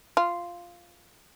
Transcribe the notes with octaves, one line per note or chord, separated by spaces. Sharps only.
F4